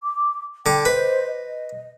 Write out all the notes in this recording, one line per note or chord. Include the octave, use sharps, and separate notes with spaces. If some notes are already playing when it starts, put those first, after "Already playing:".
D6
D3 G5 D6
B4 C5 D#5
D#5